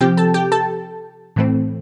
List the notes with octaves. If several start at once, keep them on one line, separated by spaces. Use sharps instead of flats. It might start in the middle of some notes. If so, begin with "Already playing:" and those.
C3 F3 C4 G4 G5
A4 A5
G4 G5
A4 A5
A2 E3 A3 C4